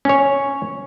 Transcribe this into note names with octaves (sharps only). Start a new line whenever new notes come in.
C#4 C#5